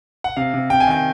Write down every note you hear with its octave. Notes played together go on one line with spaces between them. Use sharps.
F#5
C3 F5
C3
C3 G5
G#5
D#3 G5